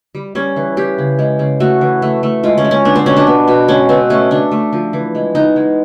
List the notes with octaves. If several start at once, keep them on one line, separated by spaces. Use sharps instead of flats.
G3
G3 C#4
E3
E3 G4
C#3
G#3
C#3
A3 F#4
E3
A3
A3
G#3 F4
C#4
G#3
C#4
B3 D4
C4
B2 C#4
D4
B3
B2
G#3 C#4
B2 C4
A3 C#4
A3 D4
A3
F3
E3
G#3
B3 D#4
G#3